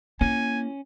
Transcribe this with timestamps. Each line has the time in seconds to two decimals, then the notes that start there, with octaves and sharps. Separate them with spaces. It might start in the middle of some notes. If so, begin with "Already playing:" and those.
0.21 A#3 C#4 E4 G#5